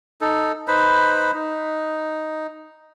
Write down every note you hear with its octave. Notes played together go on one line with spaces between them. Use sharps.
D#4 A4
D#4 B4 C5 B5
D#4